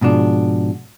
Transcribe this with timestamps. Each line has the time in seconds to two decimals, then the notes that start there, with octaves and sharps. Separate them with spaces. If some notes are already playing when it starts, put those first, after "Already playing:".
0.01 G#2 B2 F3 D4